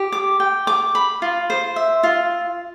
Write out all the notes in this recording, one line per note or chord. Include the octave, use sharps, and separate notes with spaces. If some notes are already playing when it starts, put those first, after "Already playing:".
Already playing: G4
D6
G5
D6
B5
F4
C5
E5
F4